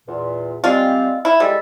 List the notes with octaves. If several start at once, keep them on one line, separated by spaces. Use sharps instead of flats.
E2 A#2
G3 G#3 C4 F4
E4
G3 G#3 A4